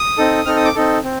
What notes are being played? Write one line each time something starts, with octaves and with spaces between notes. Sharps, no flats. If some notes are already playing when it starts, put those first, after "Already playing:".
Already playing: D#6
C4 D#4 A4
C4 D#4 A4 F6
D#6
D6
C4 D#4 A4
C4